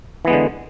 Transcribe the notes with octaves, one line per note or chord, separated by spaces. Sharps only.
D3 E3 G#3 B3